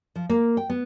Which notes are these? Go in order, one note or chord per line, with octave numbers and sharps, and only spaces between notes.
F3
A#3
G5
B3